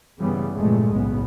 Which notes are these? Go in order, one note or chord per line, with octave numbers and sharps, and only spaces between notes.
G2 C#3 E3 G3 B3
F1 G2 A#2 E3 G#3 A3
F#1 B1 A2 C#3 B3